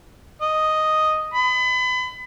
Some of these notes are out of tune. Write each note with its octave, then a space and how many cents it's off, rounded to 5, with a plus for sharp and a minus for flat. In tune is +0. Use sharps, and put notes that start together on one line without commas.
D#5 +0
B5 +35